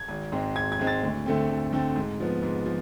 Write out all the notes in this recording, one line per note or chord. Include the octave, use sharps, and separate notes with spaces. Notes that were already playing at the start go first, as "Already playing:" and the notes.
Already playing: G#6
G#1
G#2 G#3 C4
G#1 G#6
G#6
G#2 G#3 C4
A6
D2
D3 A3 C4
D2
D3 A3 C4
G#2
F3 B3
G#2
F3